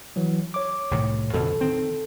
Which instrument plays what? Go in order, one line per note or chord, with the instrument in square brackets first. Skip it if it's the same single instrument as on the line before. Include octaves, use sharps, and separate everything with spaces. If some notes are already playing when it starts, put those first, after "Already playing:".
[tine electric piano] E3 F#3
C#5 D6
[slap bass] C2 A2 D#3
[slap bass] F2 B2 D3 [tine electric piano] A4
[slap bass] D#3 C4